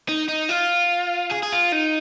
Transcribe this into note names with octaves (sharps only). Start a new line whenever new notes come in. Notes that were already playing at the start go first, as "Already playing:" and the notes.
D#4
D#4
F4
G#4
G#4
F4
D#4